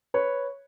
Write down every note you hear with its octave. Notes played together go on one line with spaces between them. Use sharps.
B4 C#5